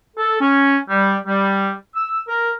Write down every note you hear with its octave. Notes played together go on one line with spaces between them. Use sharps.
A4
C#4
G3
G3
E6
A#4